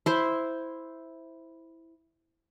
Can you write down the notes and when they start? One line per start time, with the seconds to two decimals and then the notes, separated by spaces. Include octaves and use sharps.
0.06 E4 C5